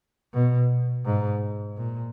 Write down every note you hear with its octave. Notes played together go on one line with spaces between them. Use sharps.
B2
G#2
A#2